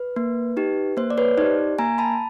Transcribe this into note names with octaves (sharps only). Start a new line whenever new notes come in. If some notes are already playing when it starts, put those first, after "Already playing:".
Already playing: B4
A#3
D#4 G4
A#3 C5
D5
B4 C#5
D#4 G4 C5 D5
A#3 G#5 A#5
A5 B5